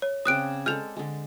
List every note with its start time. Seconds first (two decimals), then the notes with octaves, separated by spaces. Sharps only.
0.02 C#5
0.25 C#3 C4 D5 D#6 F#6 D7
0.66 G#3 A4 D5 F6 G6 F7
0.97 D3 G#3